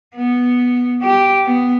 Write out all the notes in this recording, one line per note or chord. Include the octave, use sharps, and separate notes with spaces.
B3
G4
B3